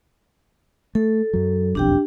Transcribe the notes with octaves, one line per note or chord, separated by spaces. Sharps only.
A3 A4
F#2 F#3
E1 B1 F2 D4 G4 G5